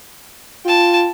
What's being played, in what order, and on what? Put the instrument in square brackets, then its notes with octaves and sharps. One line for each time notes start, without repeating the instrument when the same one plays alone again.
[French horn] F4 [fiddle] G5 A5